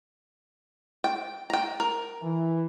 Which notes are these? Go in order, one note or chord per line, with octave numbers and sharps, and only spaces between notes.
G5
G5 A#5
A#4
E3